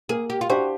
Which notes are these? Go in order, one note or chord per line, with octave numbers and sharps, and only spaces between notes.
A#3 G#4
G4
F4
D4 F#4 G4 C5